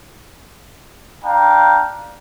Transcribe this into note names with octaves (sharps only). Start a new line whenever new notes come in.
D4 F5 G5 A#5